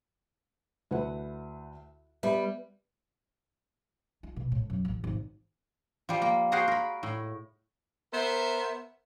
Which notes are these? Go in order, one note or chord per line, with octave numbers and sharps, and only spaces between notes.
D2 E4 B4 F#5
G3 B3 E5 B5
F4
B2
A2
F#2
A1
G#1
F3 G3
A#3
F#4 G#4 A#4 C5 F5 F#5
A#4 B5
A2
B3 A#4 C5 E5